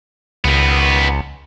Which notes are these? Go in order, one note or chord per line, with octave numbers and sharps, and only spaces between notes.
C#2 D#3 B3